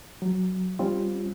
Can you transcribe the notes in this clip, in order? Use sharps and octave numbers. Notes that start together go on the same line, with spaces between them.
F#3
G3 C4 C#4 F4